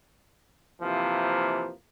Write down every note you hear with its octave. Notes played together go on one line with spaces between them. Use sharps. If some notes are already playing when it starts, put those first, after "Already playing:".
C3 E3 F3 A#3